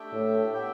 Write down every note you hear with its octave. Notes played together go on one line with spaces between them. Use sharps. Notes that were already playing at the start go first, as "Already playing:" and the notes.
Already playing: A3 D4 G4 E5 G5
A2
B3 G4 E5 G5